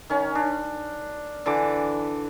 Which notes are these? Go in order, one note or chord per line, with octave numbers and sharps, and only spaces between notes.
D#3 C#4
D4
D3 E3 D6